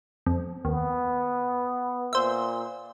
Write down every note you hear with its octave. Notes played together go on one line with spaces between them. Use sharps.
F2
D#2 B3
A#2 C5 E5